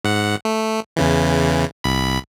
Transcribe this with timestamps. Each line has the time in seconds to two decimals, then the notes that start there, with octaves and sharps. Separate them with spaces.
0.04 G#2 F#5
0.45 A3
0.96 E2 C#3 E3
1.84 C2 B5